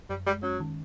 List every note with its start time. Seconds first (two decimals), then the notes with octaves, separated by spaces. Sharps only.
0.10 F#2 G3
0.26 G3 G#3
0.43 F#3 C#4
0.60 D#3